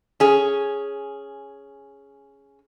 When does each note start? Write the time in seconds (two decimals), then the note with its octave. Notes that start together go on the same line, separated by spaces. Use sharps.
0.20 C#4 G#4